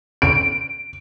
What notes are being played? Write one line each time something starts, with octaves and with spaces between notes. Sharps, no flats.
D7